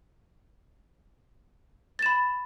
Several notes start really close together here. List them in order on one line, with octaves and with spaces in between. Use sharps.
A6 E7 B5